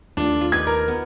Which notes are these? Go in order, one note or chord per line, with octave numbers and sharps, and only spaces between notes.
D#2 G3 A3 D4 F4
F4
D#4 G4 B4 G#6
A#4
B3